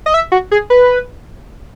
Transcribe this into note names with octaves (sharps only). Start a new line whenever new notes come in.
D#5
E5
F#4
G#4
B4